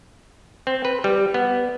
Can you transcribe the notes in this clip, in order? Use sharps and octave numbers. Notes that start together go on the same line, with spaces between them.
C4
B4
G3
B3